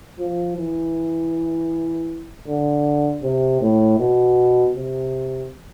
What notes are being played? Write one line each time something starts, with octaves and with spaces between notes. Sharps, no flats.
F3
E3
D3
C3
A2
B2
C3